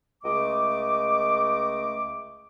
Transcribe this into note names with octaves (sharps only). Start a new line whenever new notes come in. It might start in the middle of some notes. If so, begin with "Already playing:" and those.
C#2 A3 D#5 D6